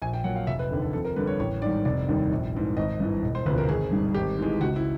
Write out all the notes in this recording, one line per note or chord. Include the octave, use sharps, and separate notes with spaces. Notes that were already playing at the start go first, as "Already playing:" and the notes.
A#1 G#5
G5
A#2 F#3 F#5
F5
F1 E5
B4
D#2 D3
A4
F2 A4
A#4
D3 G3 B4
C#5
A1 C#5
G#2 D#3 G3 D5
F1 D5
D#2 D#3 G3
A#1
G#2 E3
G#1 D#5
G2 E3
E1
C5
D2 C3 F3 B4
A#4
G#1 G#4
G2 D#3 G3
G#1 G4
G#2 E3 G#3
C#2 F#4
E4